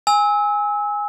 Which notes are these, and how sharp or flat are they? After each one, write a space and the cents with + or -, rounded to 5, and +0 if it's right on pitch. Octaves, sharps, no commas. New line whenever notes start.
G#5 -10 E6 -30